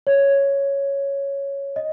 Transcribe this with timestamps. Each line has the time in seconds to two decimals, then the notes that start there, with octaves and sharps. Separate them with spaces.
0.07 C#5
1.76 D#5